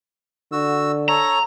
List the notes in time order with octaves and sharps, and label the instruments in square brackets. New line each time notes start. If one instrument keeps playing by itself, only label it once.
[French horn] D3 [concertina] F#4 E6
[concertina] A4 C#5 [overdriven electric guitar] A#5